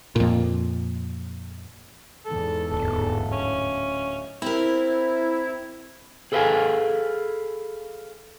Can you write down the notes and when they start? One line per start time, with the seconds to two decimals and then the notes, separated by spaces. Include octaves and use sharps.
0.16 F2 A#2
2.25 E2 G#2 A4
2.72 D1 A4
3.33 C#4
4.42 C4 E4 G4 A#4
6.32 G#4 A4 B4 D#5 F5 G#5